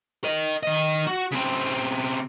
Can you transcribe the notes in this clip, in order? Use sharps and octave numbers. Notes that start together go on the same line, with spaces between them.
A#4 D#5
D#3 D#5
F#4
C#3 C4